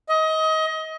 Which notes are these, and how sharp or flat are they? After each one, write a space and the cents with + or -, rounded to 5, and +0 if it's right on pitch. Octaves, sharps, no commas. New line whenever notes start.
D#5 +25